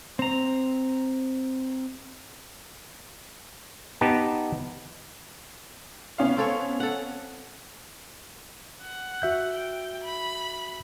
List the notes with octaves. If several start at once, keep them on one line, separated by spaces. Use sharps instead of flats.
C4 A#5
B3 D#4 G4 A5
B3 C#4 F5
C4 A4 C#5
A4 F#5
F#5
F#4 E5 G6
G5
B5